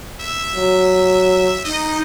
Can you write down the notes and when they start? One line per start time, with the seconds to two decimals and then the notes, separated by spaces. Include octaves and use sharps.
0.20 E5
0.56 F#3
1.65 D#4 D#5